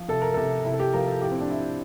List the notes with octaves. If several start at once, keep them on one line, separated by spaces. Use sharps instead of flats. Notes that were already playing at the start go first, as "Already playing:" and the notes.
Already playing: F3
C3 A4
A#4
C3 A4
C3 E4
A4
G4
F3 A#4
A4
A2 G4
C4
D4
A2 E4